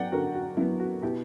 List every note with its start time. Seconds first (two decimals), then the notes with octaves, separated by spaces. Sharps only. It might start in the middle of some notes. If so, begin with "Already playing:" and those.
Already playing: F#3 B3 D5 F#5 G5
0.12 D3 F#4 A#4
0.35 F#4
0.57 F#3 B3 E4
0.80 F#4
1.02 B2 E4 G4